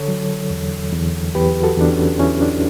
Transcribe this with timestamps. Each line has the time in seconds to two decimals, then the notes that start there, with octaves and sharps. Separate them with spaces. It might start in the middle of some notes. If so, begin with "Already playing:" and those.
Already playing: D3 A4 C#5
0.08 F#3
0.50 E2
0.93 E2
1.35 E2 G4 B4
1.63 F#4 A4
1.77 E2 D4
1.91 C#4
2.19 E2 C#4 E4
2.41 D4